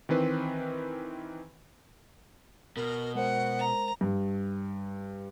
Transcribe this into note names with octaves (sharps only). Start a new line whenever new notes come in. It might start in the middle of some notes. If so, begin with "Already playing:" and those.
D#3 E3 C4 B4
B2 A#4
G#3 A#4 C5 F#5
A#5
G2